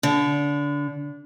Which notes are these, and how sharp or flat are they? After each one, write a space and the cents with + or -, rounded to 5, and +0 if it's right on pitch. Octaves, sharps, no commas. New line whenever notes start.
D3 -25